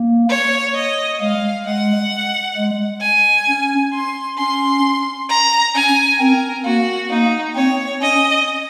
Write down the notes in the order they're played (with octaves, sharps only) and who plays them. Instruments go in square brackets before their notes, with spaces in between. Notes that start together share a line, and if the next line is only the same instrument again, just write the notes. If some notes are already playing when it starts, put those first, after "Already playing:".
Already playing: [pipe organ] A#3
[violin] C#5
D#5
[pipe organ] G#3 [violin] F5
[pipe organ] G#3 [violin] F#5
[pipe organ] G#3
[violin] G#5
[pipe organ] C#4
[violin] C6
[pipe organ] C#4 [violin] C6
[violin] A#5
[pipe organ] C#4 [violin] G#5
[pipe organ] C4 [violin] A#4
[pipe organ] A#3 [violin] F#4
[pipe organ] A#3 [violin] D#4
[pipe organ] C4 [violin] C#5
[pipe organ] C#4 [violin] D#5